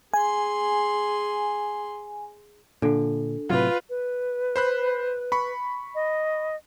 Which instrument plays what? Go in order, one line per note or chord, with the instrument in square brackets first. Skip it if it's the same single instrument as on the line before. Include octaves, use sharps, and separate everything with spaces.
[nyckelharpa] G#4 C6 [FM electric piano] G#5
[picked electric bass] A#2 D3 [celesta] D4 A4
[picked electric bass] A2 C3 F#3 [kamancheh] F4 B4
[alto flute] B4
[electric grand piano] C5 B5 F#6
B5 C#6
[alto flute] D#5